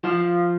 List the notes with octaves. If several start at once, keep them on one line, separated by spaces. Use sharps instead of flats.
F3 F4 F5